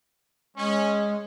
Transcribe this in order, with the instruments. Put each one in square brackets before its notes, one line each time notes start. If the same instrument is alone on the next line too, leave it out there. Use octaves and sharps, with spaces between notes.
[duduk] G#3 [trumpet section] C#4